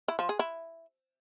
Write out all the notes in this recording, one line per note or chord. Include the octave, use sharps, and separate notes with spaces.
E4
F3
G#4
E4